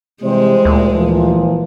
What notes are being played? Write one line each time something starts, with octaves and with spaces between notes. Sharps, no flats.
C3 E3 G3 G#3 C5
D2 A#2
A#2 E3 F3